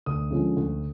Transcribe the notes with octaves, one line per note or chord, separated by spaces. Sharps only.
D2 D#6
D3 F3 G#3 C#4
D2